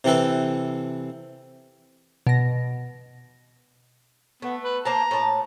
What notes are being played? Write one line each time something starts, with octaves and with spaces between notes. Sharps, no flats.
C3 E3 C4 A4 B4
B2 A#6
A3 B3
B4
A#3 C5 A5 A#5
A2 A5